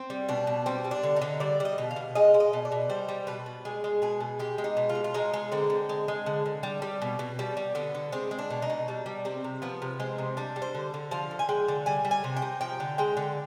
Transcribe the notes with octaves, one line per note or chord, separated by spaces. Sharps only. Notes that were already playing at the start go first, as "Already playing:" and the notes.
Already playing: C4
G3
B2 D4
B2
G3 C4
G3
D4
D3
D#4
D3
G3 D5
G3
D#5
B2
F5
B2
G#3 D#5
G#3
D#5
B2
D5
B2
G3 C5
G3
B2 B4
B2
G#3 G#4
G#3
B2 G#4
B2
G#3 G4
G#3
D#4
B2
F4
B2
F4
G#3 D#4
G#3
D3 C4
D3
G#3
G#3
D3
D3
G3
G3
B2
B2
G3
G3
D3 B3
D3
G#3 C4
G#3
D4
B2
D#4
B2
G3 D4
G3
C3 C4
C3
F3 B3
C3
G#3 C4
C3
G3 D4
G3
C5
D3
D3
F3 F5
D3
G#5
G#3 G5
D3
G3 G#5
G3
G#5
C3
G5
C3
F3 G5
D3
G#3 G5
D3